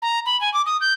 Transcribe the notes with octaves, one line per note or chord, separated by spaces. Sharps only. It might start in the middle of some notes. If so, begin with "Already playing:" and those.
A#5
B5
G#5
D6
D#6
G6